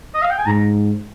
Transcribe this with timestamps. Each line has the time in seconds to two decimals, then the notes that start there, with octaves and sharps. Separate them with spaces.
0.14 D#5
0.22 F5
0.30 G5
0.38 G#5
0.46 G#2 A#5